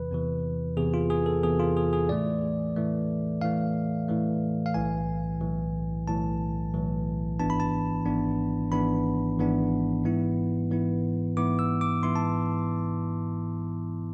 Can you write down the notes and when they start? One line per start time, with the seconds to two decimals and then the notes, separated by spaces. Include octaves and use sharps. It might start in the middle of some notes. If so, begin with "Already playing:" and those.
Already playing: E2 C3 E3 B4
0.11 E2 C3 E3
0.77 E2 C3 E3 G#4
0.94 F4
1.10 G#4
1.26 A4
1.43 E2 C3 E3 G#4
1.60 F4
1.77 G#4
1.93 G#4
2.09 A2 E3 A3 D5
2.76 A2 E3 A3
3.41 A2 E3 A3 F5
4.08 A2 E3 A3
4.66 F5
4.74 B1 A2 E3 G#5
5.41 B1 A2 E3
6.07 B1 A2 E3 A5
6.73 B1 A2 E3
7.40 G#1 G#2 E3 B3 D4 A5
7.50 B5
7.60 A5
8.05 G#1 G#2 E3 B3 D4
8.72 G#1 G#2 E3 B3 D4 B5
9.38 G#1 G#2 E3 B3 D4
10.04 G#2 E3 B3 E4
10.71 G#2 E3 B3 E4
11.37 G#2 E3 B3 E4 D6
11.59 E6
11.81 D6
12.03 G#2 E3 B3 E4 C6
12.16 A5